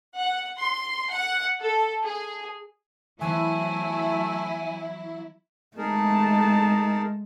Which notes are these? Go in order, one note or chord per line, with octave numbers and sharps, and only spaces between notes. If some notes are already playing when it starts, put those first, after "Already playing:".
F#5
C6
F#5
A4
G#4
E3 F#3 A3 B3 E4 C5 G#5
G#3 A3 D#4 G#4 A#4 A5